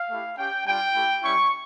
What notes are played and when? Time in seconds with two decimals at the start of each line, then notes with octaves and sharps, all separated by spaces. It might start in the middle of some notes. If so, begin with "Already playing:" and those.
Already playing: F5
0.09 A3 E4 G4
0.38 C#4 G4 G5
0.66 G3 D4 F4 G5
0.94 A3 E4 G4
1.23 G3 C#4 E4 C#6